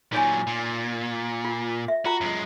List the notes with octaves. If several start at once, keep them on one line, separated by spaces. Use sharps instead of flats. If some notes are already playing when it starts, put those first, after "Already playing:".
A#2 F#3 D#4 C#5 G#5
A#2
F4
E5
F4 F#4 A#5
F#2 G#3